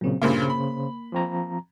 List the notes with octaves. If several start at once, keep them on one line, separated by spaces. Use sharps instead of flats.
A#2 C#3 F#3 C4
G2 A#2 C#3 A#3 F4 C5
B5
F3 C4 A#5